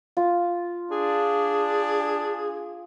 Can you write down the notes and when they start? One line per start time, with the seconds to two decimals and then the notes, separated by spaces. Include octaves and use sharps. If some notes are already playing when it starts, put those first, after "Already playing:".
0.17 F4
0.91 D4 G#4